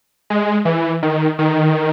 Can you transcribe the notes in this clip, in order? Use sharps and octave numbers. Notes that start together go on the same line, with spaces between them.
G#3
E3
D#3
D#3